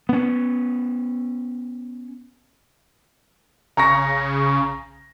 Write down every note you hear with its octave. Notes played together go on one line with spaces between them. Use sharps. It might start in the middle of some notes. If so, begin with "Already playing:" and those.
B3 C#4
A#1 C#3 A#5 C#6 A#6